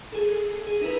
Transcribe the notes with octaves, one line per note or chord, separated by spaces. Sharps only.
G#4 A4
G#4
D#4 E4 A#4 B4